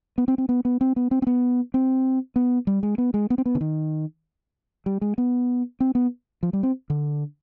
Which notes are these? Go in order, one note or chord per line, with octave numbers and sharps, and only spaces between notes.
B3
C4
C4
B3
B3
C4
B3
C4
C4
B3
C4
B3
G3
G#3
B3
G#3
B3
C4
B3
D3
D#3
G3
G#3
B3
C4
B3
F3
G3
C4
D3